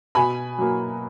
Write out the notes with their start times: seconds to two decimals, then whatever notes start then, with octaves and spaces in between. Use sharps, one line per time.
0.15 B2 G#5 B5
0.58 F#3 A#3